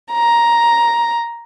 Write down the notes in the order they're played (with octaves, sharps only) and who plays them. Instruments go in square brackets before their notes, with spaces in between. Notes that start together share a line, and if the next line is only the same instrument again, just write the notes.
[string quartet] A#5